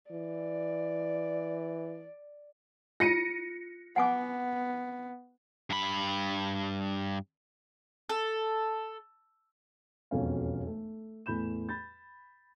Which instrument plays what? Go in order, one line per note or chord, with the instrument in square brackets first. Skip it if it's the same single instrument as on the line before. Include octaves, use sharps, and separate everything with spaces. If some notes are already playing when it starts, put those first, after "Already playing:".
[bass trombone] E3 [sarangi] D5
[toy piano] F4 [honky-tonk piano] A#6 C#7 D#7
[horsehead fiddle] B3 [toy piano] F#5 G#5 D6
[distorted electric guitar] G2 B5
[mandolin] A4
[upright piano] E1 B1 F2 C#4 F#4 F5
A3
E2 A2 B5 G6 E7
B5 G6 A6